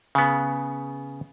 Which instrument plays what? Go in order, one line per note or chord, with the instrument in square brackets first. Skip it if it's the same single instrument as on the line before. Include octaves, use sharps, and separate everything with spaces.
[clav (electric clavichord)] C#3 B3